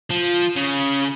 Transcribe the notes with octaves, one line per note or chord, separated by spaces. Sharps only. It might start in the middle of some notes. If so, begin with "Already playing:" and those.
F3
C#3